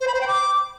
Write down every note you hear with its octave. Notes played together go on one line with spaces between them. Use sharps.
C5
B5
C5
G5
D6